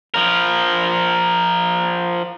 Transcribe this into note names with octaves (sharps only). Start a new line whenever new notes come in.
F3 A#4